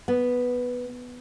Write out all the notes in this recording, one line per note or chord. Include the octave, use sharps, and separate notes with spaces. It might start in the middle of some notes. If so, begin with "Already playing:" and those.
B3